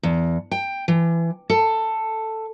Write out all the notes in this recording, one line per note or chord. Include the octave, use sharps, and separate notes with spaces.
E2
G5
E3
A4